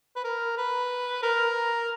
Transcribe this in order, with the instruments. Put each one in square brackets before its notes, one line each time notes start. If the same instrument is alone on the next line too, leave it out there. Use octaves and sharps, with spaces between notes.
[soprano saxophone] B4
A#4
B4
A#4